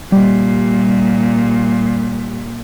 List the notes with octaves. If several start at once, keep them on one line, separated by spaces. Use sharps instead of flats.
A#2 G3